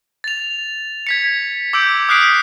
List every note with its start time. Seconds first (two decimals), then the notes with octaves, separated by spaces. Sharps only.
0.24 A6 F7
1.07 G#6 B6 C#7
1.73 D6 E6 G6 D7
2.09 D#6 F6 F#6 B6 C7 D7